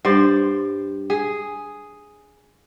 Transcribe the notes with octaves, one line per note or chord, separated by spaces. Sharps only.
G2 C5 D5
G#4